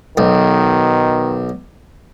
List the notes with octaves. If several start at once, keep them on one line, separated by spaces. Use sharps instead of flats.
B1 D#3